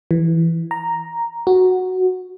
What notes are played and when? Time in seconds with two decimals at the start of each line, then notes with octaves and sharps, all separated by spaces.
0.11 E3
0.71 A#5
1.47 F#4